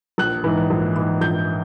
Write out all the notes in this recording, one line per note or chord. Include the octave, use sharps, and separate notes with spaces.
A#1 F#6
G#2 E3
A#1
G#2 E3
A#1 G6